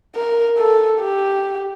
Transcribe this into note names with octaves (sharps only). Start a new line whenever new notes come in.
A#4
A4
G4